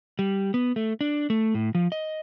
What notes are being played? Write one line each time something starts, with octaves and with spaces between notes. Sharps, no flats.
G3
B3
A3
D4
A3
A2
F3
D#5